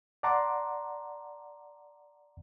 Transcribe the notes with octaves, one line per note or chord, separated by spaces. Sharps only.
D5 F#5 A5 A#5 C6 D6